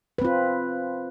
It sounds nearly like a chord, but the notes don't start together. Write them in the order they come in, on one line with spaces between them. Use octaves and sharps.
B4 C4 F4